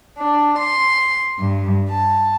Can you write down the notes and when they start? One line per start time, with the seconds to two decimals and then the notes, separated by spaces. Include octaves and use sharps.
0.17 D4
0.58 C6
1.39 G2
1.89 A5